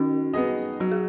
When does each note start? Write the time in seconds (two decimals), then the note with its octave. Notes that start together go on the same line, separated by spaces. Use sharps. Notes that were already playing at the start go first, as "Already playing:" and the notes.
Already playing: D#3 C#4 F#4
0.34 B3 D#4 G#4 D#5
0.80 F#3 F#4
0.91 G#4